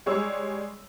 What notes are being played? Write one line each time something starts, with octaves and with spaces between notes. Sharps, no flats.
G3 G#3 C#5 E6